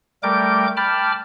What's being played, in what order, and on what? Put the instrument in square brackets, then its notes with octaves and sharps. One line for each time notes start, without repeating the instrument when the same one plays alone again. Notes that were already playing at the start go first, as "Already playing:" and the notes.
[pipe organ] G3 A3 A#4 G5 D6 G6
G5 A5 B5 D6 F6